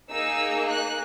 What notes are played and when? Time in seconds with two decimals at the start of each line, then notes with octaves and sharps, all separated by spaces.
0.10 A#3 D#4 G#4 E6
0.69 F#6